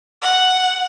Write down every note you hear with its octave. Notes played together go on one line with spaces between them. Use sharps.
F#5